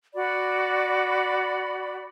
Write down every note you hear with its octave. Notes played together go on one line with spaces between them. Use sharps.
F#4 D5 B5